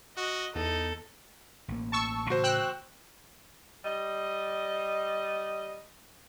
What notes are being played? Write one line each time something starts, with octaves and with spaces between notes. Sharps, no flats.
F#4 D#5
E2 D#4 A4
A1 A#3
A5 C#6 E6
A2 C#3 E3 F#4 C5
G5 E6 F#6
G3 D#5